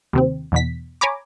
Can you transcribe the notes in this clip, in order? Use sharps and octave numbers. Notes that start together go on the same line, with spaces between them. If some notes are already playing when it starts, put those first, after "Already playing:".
D#2 C3 C4
E2 B2 B6
C#5 G#5 A#5 B5 D6